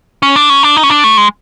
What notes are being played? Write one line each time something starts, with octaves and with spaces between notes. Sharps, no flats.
C#4
D4
C#4
D4
D#4
C#4
D4
A3
G#3